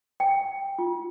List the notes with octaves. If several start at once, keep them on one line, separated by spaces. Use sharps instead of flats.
G5
F4